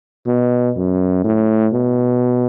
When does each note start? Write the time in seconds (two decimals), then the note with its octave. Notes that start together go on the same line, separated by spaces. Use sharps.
0.26 B2
0.76 F#2
1.24 A2
1.73 B2